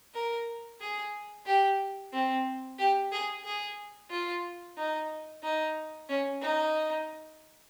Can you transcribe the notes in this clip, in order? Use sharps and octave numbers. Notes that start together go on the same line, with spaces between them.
A#4
G#4
G4
C4
G4
G#4
G#4
F4
D#4
D#4
C#4
D#4